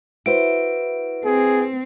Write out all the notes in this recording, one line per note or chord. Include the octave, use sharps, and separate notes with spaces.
E4 F#4 B4 C5 D7
C4 G#4